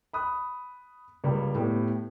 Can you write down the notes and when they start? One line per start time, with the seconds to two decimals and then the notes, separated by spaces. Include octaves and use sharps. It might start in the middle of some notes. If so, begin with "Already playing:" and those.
0.13 B5 D#6 F#6
1.24 C#2 G3 A#3
1.54 A2 B3 G4